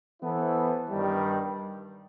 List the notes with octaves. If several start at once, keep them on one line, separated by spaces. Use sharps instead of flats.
E3 B3 E4 A4 C5
G2 D#3 G3